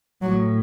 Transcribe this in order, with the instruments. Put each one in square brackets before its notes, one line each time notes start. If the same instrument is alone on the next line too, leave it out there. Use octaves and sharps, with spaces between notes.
[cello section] A2 [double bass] F#3